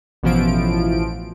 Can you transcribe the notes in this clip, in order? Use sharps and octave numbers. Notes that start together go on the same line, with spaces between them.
A1 B2 E3 F3 D7